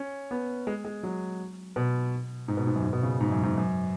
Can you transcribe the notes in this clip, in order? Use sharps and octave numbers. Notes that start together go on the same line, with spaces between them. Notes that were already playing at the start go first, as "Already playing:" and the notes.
Already playing: C#4
B3
G#3
G#3
F#3
B2
G#2
B2
G#2
F#2
G#2
B2
C#3
G#2
F#2
G#2
F#2